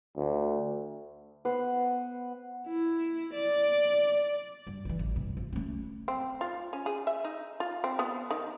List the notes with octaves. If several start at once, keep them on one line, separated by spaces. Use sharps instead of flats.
D2
B3 C5 F#5
E4
D5
G2
E3 F3
A1
G2 C3
F3
A3 C#4
C4
F4
C#4
G#4
E5
D#4
F4
C4
B3
D#3